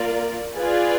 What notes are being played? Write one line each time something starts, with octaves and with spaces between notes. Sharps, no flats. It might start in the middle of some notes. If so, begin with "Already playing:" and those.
Already playing: A#3 F4 A#4 D5
F4 G#4 B4 D5